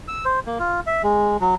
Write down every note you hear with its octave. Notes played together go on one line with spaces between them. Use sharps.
E6
C5
A#3
F4
E5
G#3
F#3